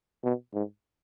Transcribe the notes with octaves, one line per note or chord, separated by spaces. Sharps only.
B2
G#2